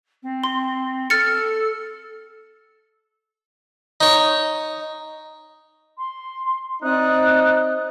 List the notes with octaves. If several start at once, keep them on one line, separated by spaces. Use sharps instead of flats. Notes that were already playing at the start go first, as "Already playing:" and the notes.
C4
C6
A4 F6 A6 C#7
D#4 C#5
C6
C4 D#4 D5 D#6 F#6